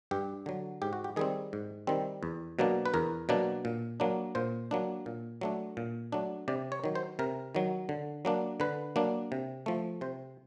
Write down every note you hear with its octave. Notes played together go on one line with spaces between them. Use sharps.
G2 G4
D3 F#3
G#2 G4
F#4
G4
D#3 G3 C4 G#4
G#2
D#3 G3 C4
E2
B2 F#3 A#3 D4
B4
E2 A#4
B2 F#3 A#3 D4
A#2
F#3 A#3 D4
A#2 C5
F#3 A#3 D4
A#2
F#3 A3 D4
A#2
F#3 A3 D4
C3 D5
C#5
D#3 F#3
C5
C3 A#4
D#3 F#3
D3
F#3 A#3 D4
D3 B4
F#3 A#3 D4
C3
F3 A3
C3 C5